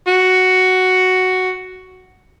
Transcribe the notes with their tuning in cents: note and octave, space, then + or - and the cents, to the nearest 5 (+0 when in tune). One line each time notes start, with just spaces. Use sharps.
F#4 +5